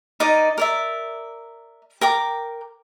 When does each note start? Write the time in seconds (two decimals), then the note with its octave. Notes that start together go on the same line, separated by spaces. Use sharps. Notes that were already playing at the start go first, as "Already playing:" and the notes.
0.20 D#4 A#4 D5 D#5
0.58 A#4 D5 E5
2.01 A#4 G5 D6